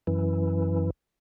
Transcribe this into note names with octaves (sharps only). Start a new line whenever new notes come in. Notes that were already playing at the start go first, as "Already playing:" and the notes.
F#2 E3